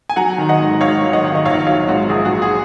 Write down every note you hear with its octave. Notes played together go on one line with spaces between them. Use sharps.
G#5
F#3 F#5 A#5
D#3
D#5 F#5
G#2
G#1 C#5 F5
F#3
D#5 F#5
D#3
D#5
A#1 C#5 F5
F#3 C#5 F5
G#2 F#4
A#1 G#4
F#4
A#1
G#4